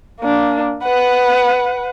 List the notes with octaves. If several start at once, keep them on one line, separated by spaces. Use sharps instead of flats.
A#3 D4
B4 F#5